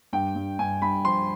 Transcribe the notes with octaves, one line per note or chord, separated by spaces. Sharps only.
G2 G5
G2
G2 G#5
G2 B5
F3 C6